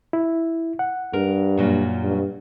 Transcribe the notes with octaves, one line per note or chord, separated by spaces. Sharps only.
E4
F#5
G2 A#4
F#2 A#2 F#3
G2